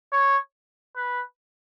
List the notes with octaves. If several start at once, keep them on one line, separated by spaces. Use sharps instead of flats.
C#5
B4